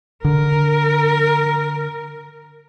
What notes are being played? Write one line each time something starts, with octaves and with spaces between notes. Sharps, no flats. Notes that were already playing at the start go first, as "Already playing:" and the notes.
D3 A#4